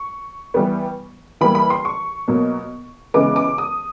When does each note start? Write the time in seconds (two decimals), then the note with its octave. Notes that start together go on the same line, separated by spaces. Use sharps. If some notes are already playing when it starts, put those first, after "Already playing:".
Already playing: C#6
0.54 E3 G3 B3
1.41 E3 G3 A#3 B5
1.55 B5
1.70 C6
1.85 C#6
2.28 B2 F#3 A#3
3.14 C#3 E3 G#3 B3 D6
3.36 D6
3.58 D#6